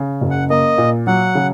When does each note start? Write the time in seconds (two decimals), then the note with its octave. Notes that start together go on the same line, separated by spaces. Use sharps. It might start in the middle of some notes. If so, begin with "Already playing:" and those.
Already playing: C#3
0.21 F#1
0.31 F#5
0.50 A#3 D#5
0.78 A#2
1.07 F#3 F#5
1.35 C#3